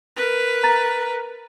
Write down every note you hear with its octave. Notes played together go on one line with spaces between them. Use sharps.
A#4 B4
A#5 A6